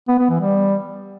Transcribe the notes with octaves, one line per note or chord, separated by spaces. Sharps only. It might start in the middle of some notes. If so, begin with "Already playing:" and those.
B3
B3
E3
G3